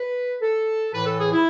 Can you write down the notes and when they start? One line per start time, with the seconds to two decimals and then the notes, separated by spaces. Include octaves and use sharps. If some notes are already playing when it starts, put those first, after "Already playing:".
Already playing: B4
0.41 A4
0.93 A2 E3 B4
1.06 A4
1.19 G#4
1.32 E4